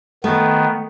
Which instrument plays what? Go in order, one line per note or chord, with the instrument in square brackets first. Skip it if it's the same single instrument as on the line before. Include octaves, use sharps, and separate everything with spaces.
[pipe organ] D#3 B3 [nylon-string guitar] A3